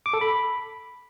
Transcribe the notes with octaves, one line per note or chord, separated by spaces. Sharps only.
D6
A4
B5